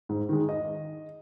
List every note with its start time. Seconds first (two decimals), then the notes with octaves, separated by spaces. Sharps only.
0.09 G#2
0.29 D#3 G#3
0.49 D#5